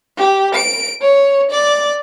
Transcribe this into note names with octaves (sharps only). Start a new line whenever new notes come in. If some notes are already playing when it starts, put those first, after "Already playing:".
G4
D7
C#5
D5